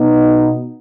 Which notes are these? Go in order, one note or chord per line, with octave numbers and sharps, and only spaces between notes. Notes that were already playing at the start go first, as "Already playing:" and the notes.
Already playing: B2 B3 D#4